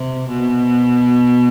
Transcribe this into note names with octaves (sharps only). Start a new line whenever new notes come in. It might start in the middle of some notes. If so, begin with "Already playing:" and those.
Already playing: C3
B2